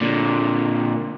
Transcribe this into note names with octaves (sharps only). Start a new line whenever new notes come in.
A#2 D3